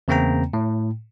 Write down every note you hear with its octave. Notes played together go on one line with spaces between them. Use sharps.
E2 C#3 A#3 C4 G5 A#5
A2